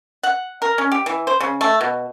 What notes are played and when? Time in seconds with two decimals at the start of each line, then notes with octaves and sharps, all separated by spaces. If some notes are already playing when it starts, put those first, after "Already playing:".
0.23 F#5
0.62 A#4
0.78 C#4
0.92 G4
1.06 E3
1.27 C5
1.40 C#3
1.61 A3
1.81 B2